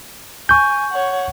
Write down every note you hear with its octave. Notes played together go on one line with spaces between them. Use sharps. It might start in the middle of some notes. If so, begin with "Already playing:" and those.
G#5 C#6 G6
C#5 F#5